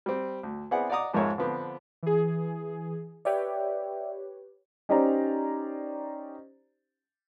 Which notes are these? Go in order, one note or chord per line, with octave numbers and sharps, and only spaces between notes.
G3 C4
D2
B3 C4 E4 G#4 D5 F#5
D5 D#5 F#5 A#5 D6 D#6
F2 G#2 G#3 A#4 C#5 E5
D3 F3 B3 C4 D4
E3 G#4
G4 B4 C#5 D5 E5 G5
C#4 D#4 G4 C5 D5 A#5